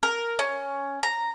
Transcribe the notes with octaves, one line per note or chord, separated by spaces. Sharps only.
A#4
C#4
A#5